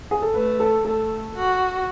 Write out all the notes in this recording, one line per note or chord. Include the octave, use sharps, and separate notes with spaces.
G#4
A4
A3 B4
A4
A3 A4
F#4